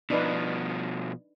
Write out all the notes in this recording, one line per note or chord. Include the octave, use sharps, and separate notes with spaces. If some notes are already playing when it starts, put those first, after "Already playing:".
B2 F3 D4 D#4 B4